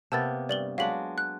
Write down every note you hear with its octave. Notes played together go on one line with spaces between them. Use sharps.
C3 A#3 B3 A5 E6 A6
G2 D5 F#7 G7
F#3 G#3 D4 F5 B6 F#7
F#6